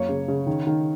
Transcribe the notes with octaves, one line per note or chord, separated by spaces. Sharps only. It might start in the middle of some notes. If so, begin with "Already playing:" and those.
Already playing: F#2 A#3 C#5
C#3
C#3
D#3
D#3